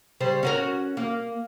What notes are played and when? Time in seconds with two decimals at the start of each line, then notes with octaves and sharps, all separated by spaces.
0.20 C#3 G3 C5
0.43 C#4 F#4 A#4
0.97 A#3